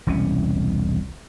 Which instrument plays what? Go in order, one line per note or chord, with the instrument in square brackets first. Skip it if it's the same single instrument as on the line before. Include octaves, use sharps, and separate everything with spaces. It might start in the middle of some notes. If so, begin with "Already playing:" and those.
[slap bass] E1 C2 E3 C#4